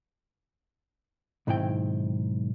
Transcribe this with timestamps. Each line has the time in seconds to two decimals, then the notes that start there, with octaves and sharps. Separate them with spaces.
1.47 B1 G#2 D#3 C4 E4 G5